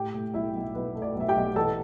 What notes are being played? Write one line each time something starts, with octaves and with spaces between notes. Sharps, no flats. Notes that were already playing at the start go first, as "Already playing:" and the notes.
Already playing: A2 G4 G5
A2
B1 E4 E5
B1
B1 B4
A3
D5
B1
E5
G4 G5
B1
E3 A4 A5